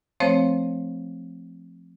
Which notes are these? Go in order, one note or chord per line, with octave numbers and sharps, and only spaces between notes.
F3 A3 C4 C5 C#5